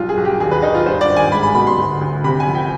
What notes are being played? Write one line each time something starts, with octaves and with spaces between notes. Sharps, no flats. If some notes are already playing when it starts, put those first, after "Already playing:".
Already playing: B1 G3 F4
G#4
B1
G4
D#2 G#4
B4
D#3 D#4
F4
G2 C5
D5
G#1
G#5
G#3 B5
B5
B2 B5
C6
D2
D2
C3 B5
G#5
F3
G5